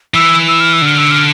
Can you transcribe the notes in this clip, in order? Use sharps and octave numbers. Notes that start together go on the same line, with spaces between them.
E3 E6
E6
F6
E6
D3 F6
E6
F6